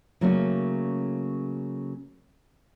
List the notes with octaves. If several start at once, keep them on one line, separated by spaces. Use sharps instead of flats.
C#3 F#3 A3 A#3 C#4